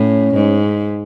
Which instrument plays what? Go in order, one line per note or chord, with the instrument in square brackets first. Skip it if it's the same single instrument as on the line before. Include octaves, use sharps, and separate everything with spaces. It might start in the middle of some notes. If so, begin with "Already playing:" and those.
Already playing: [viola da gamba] A2 [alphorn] C#4
[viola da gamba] G#2